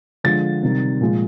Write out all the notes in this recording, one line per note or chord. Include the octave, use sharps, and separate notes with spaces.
D3 F3 G#3 A6
C3 D#3 G3
A#2 F3 G#3